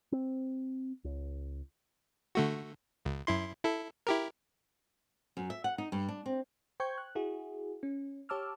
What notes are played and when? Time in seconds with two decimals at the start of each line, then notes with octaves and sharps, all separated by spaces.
0.12 C4
1.04 C#2
2.35 D3 A3 F#4
3.05 C#2
3.27 F#2 E4 C6
3.63 E4 A4
4.07 E4 G4 A#4
5.37 F#2
5.50 E5
5.64 F#5
5.78 D#4
5.92 G2
6.09 D4
6.26 C4
6.80 C5 G5 C#6 G6 G#6
6.98 F#6
7.15 E4 F#4 G#4
7.83 C#4
8.29 G4 C#5 A5 D6 E6 F6